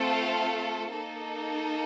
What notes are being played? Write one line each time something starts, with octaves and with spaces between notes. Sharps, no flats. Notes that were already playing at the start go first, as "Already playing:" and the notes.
Already playing: A3 C4 F4 A4
F5
A#3 D#4 A4